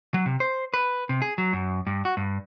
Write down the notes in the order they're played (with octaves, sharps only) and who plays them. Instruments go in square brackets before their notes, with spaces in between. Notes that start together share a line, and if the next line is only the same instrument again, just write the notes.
[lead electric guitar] F#3
C3
C5
B4
C3
G#4
F#3
F#2
G2
F#4
G2